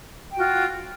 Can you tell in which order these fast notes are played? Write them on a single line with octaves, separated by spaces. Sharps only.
G5 F#4 F4